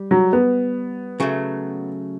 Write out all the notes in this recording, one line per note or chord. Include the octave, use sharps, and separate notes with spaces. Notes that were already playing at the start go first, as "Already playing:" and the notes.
Already playing: G3
F#3
B3
C#3 F#3 A3